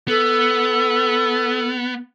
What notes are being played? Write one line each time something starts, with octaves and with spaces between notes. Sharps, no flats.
B3 A4